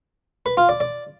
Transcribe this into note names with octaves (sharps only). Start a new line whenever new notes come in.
B4
F4
D5
D5